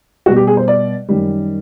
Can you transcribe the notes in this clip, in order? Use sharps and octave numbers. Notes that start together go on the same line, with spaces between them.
B2 G3 B3 F#4
G4
G#4
C5
D5
F#2 D#3 G3